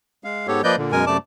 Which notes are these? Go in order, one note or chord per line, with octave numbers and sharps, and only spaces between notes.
G#3 F5
G#2 B3 G4 A4 C#5
F3 A#3 B4 D5 D#5 G6
A#2 D3
F#2 B2 G#3 A#4 G#5
F#2 C3 A3 D5 A5 D6